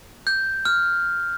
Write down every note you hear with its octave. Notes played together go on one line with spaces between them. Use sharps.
G6
F6